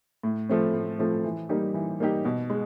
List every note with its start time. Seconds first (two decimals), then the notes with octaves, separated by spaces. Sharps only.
0.23 A2
0.49 F3 A3 C4
0.74 A2
0.99 F3 A3 C4
1.24 E3
1.49 G3 A#3 D#4 G4
1.74 E3
2.00 G3 A#3 D#4 G4
2.25 B2
2.50 G#3